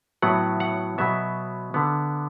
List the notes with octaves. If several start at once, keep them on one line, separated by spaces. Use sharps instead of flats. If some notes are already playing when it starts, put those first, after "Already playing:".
A2 F#3 B3 F#5
F#5
B2 F#3 B3 E5
D3 B3